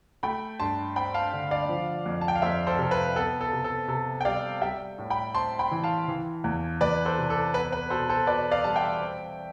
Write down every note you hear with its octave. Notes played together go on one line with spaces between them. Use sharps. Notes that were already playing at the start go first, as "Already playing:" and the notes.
A3 G5 B5
G2 A5 C6
C4 G5 B5
F5 A5
D3
D5 F5
F3
F2
A5
G5
F5
F2 C5 E5
A4 C5
C3 A4
B4
B3 A4
A4
C3
A4
C3 A4
G5
G3 D5 F5
G3 E5 G5
A2
G5 B5
C4 A5 C6
G5 B5
E3
F5 A5
E3
E2
E2 B4 D5
A4 C5
C3
A4
B3 B4
B4
B2 A4 C5
A4 C5
B2 B4 D5
D5 F5
G3 A5
E5 G5
C4